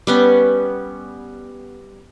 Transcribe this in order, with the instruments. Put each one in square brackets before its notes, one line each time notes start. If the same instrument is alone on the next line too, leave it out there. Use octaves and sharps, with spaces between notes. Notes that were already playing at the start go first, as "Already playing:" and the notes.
[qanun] G3 B3 C#4